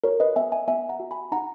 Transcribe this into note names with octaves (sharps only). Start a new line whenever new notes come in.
F#4 A#4 C#5
B4 D#5
B3 E5 G#5
E5 G#5
B3 E5 G#5
F#5 A#5
F#4
G#5 B5
D#4 F#5 A#5